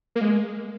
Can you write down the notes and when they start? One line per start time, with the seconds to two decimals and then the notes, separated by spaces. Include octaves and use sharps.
0.16 A#3
0.21 G#3